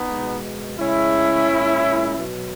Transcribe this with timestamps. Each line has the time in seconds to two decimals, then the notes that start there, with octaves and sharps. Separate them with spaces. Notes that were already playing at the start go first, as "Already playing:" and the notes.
Already playing: B3 D#4
0.11 B2 G#3
0.79 C#3 G#3 C#4 E4
1.48 A#2 G#3
2.16 B2 F#3